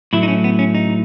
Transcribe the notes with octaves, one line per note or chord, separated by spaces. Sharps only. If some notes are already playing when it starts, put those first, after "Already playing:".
A2 F#3 A3 E4
D#4
C#4
B3
C#4
D#4